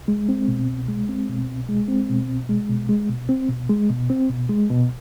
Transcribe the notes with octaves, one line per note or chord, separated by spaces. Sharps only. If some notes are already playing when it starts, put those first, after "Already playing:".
Already playing: C2
G#3
C4
B2
C2
G#3
C4
B2
C2
G#3
C4
B2
C2
G#3
B2
G#3
B2
C4
B2
G#3
B2
C4
B2
G#3
B2